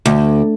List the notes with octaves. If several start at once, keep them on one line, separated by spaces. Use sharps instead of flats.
D2